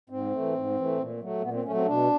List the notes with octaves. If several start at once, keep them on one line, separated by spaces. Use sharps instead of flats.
G#2 C4
E3 A3
G#2
E3
A3
A#2
F#3 A3
A#2 B3
C4
F#3 A3 C#4
C4
B2 D4